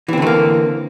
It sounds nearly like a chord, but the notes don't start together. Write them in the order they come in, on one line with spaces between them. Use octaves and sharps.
E3 C4 D3 A3 A#3